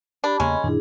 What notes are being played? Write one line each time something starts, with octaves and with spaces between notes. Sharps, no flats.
D4 G4 B5
E2 C#3 G#3 A#3 C#4 D#5 B5
F#2 A#2 D#3 D4 E4 G#4